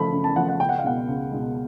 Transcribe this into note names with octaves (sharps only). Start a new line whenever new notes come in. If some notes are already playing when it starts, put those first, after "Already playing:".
Already playing: C#3 F3 A3 B5
C#3
A5
F3 A3 F#5
F#5
C#2 G5
F#5
F5
B2 G#3 F#5
C#2
B2 G#3